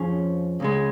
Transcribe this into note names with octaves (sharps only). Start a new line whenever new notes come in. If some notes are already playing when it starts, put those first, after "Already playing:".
Already playing: F2 F3 C#4 G#4 C#5
C#2 C#3 G#3